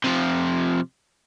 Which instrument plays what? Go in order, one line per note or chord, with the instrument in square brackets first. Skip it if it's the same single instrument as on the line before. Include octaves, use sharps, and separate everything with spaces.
[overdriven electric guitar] C3 F3